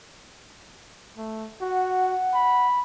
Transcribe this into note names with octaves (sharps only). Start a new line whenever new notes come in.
A3
F#4 F#5
B5